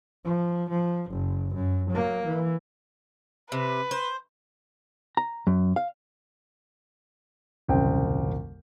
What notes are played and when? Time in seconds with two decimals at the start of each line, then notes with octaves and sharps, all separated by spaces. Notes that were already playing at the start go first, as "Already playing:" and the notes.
0.24 F3
0.69 F3
1.10 F#1
1.54 F#2
1.90 F#3 A#3
2.25 E3
3.52 C3 B4
3.91 C5
5.17 A#5
5.47 F#2
5.76 F5
7.68 D#1 C2 F#2 C#3 C5 G5